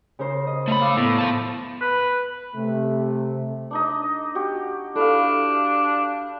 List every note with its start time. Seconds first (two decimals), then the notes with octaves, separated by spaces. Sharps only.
0.19 C#3 A#4 C5
0.47 D#5
0.68 A3 B5
0.80 F5 D6 E6
0.97 A2 B3
1.19 F5 A5
1.81 B4
2.56 C3 A3
3.71 D4 D#4 D#5
4.35 F#4 G4
4.96 D4 E4 A4 F5